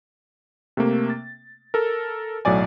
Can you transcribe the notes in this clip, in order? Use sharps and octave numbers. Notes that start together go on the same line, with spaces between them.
C3 A3 A#3
A6
A4 A#4
B1 A2 F#3 D5 G#5